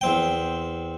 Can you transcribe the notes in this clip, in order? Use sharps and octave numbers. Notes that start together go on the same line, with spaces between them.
E2 C4 G5